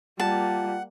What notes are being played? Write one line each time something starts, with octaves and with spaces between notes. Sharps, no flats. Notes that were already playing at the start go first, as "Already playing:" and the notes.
G3 A#3 F4 F#5 A5